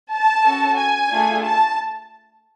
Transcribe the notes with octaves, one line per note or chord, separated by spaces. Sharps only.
A5
C#4 F#4 A4
G#5
A3 D4 F4 G#4
A5